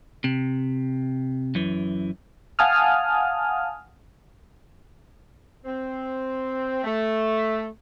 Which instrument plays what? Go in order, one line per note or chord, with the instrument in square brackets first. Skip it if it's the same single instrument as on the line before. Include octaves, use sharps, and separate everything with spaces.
[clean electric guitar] C3
F#2 E3
[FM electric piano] F5 F#5 G#5 A5 D#6 F6
[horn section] C4
A3